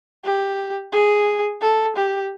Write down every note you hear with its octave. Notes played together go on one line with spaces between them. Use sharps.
G4
G#4
A4
G4